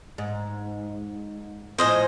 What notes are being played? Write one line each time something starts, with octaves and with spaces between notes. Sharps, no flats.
G#2
A2 F3 C5 D#5 G#5